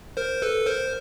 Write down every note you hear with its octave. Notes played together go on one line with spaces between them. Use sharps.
A#4 C5
A4 B4
A#4 C5